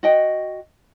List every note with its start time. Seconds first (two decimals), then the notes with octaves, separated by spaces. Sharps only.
0.03 F#4 D#5 G5